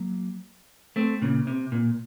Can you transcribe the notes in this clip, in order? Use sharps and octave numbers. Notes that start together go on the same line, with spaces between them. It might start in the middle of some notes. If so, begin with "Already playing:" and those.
Already playing: F#3 A#3
A3 C4
A#2 C#3
C3
A#2